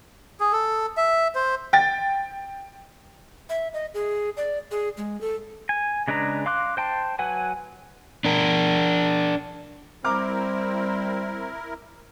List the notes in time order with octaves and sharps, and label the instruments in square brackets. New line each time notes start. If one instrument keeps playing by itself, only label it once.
[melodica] G#4
A4
E5
C5
[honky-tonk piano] G5 A6
[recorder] E5
D#5
G#4
D5
G#4
G#3
A4
[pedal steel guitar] G#5
C#3 G#3 D4 B4 A#5
F5 C6 D6 F#6
C5 G5 A5 C6
F#3 B4 F#5 G#5
[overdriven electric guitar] D4 A#4
[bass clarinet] G3 [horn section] C4 [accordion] E4 A#4 [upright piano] A#5 D6 F6